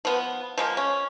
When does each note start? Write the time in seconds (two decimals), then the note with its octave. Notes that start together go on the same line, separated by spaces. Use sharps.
0.05 F3 B3
0.58 F3 G#3 A#3
0.77 C#4